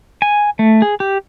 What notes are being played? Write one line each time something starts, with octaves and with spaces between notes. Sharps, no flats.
G#5
A3
G#4
G4